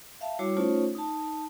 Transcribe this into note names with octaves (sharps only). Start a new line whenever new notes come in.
E5 F5 A5
G3 E4 F#4 C#5 D6
A3 C#4 D#4 F4 C5 C#5
D#4 A5